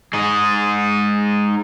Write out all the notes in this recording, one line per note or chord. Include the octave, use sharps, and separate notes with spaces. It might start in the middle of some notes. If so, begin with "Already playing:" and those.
G#3 D#4